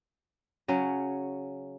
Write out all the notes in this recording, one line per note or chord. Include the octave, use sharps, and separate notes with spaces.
C#3 F#3 C#4